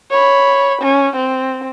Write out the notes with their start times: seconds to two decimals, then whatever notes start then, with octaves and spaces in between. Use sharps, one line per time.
0.11 C#5 B5
0.82 C#4
1.16 C4